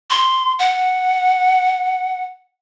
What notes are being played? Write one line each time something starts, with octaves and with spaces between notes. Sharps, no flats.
C6
F#5